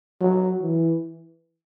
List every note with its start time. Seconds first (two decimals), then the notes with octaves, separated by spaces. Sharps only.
0.20 F#3
0.63 E3